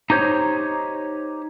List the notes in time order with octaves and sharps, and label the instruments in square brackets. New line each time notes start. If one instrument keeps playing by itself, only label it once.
[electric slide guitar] D#4 G4 C5 C#5